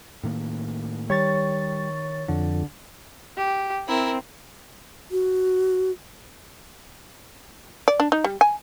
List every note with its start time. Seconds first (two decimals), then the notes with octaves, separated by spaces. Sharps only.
0.23 A2 D#3 A#3
1.10 D#3 G3 C#5 C#6 A6
2.28 F2 D3
3.38 G4
3.88 C4 E4 A#4
5.11 F#4
7.88 D5
8.00 D4
8.12 D#4
8.24 G3
8.41 G#5